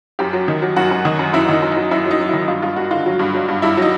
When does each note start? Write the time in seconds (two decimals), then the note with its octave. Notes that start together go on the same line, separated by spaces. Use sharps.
0.19 F#2 G4
0.33 F#3
0.48 D#3
0.62 F#3
0.76 F#2 F#4
0.91 F#2
1.05 D#3
1.19 F#2
1.33 F#2 E4
1.49 D#3 D#4
1.62 F#2
1.71 D#4
1.77 F#3
1.91 F#2 E4
2.05 F#3
2.11 D#4
2.20 F#3
2.29 D#3 E4
2.48 G2 F4
2.62 G2 F4
2.76 G2 F#4
2.91 D3 F4
3.06 F#3
3.19 G2
3.34 F#3
3.49 G2
3.62 G2 E4
3.77 F#3 D#4